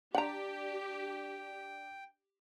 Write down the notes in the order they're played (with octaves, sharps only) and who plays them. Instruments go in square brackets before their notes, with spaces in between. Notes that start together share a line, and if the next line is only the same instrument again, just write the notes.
[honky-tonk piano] D4 [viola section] G4 [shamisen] F#5 A#5 [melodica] G5